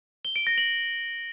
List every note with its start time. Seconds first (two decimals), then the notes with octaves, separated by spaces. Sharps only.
0.25 G7
0.36 D7
0.47 A#6
0.58 F#7